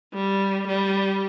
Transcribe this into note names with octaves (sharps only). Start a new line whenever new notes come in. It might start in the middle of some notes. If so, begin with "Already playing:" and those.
G3
G3